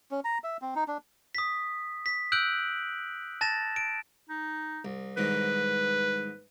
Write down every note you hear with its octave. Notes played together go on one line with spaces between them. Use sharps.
C#4
A#5
E5
C4
D#4
D4
D#6 B6
B6
E6 F#6 G6 D7 F#7
A5 A6 A#6 E7
D7
D#4
C2
C2 G#2 D#3 B4